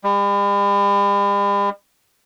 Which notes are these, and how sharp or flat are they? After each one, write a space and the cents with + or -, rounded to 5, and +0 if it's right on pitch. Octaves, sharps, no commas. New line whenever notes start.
G3 +45